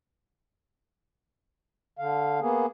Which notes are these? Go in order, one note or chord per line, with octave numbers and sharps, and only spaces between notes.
D3 F5
A#3 B3 G#4